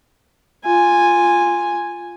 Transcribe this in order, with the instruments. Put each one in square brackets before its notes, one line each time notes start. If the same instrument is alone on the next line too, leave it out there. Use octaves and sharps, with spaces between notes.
[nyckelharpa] F4 G#5